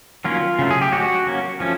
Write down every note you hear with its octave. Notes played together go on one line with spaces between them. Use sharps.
D#3 F#3 A#3 C#4 F4
C#3 F#3 A3
G#4
G4
F3 G#3 C#4 F#4
F#3 A#3 C#4
F3 A3 C#4